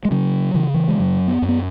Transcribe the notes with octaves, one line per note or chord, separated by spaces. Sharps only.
G#3
C#3 F#3
C#3 E3
E3
G#3
F#2 F#3
B3
F#2
B3